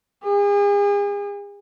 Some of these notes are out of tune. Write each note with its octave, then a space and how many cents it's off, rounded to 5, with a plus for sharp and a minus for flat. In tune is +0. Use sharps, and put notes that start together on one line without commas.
G#4 -40